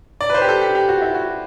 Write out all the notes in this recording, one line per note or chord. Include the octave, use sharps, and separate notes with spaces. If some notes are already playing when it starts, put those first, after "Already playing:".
D5
B4
C5
G4
A4
G4
G4
F#4
E4
F#4